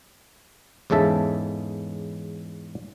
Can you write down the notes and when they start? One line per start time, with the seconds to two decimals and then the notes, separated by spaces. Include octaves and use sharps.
0.90 E2 G#2 C#3 A4 E5